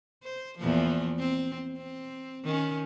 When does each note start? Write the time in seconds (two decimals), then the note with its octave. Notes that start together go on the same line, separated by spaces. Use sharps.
0.23 C5
0.58 E2 A#2 F3
1.19 C4
1.77 C4
2.44 D#3 C#4